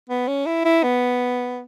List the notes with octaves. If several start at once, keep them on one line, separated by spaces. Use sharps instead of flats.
B3
C#4
E4
E4
B3